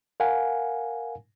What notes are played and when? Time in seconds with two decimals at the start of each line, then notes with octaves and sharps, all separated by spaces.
0.20 A#4 F5 F#5 G#5